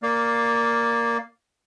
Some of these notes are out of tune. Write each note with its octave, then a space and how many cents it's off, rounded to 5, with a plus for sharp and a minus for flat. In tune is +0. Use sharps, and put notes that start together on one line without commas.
A#3 +0 D5 +0 F5 +0